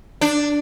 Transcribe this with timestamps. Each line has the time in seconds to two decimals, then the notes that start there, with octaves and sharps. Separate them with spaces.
0.21 D4